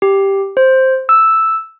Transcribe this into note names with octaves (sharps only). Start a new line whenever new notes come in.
G4
C5
E6